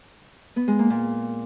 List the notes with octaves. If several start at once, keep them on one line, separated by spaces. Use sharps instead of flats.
B3
G#3
A#3
A#2